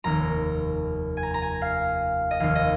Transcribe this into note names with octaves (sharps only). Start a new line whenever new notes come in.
F1 D#2 D#3 A#5
G#5
A#5
A#5
G#5
F5
D#5
F1 D#2 D#3 F5
D#5